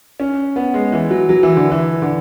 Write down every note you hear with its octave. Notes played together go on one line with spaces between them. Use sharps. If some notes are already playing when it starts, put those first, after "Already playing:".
C#4
B3
G#3
E3
F#3
F#3
E3
D3
E3
D3